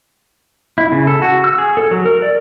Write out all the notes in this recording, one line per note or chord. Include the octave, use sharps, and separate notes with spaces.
E4
C#3
A4
F#4
E6
G#4
A4
F#3
A#4
D5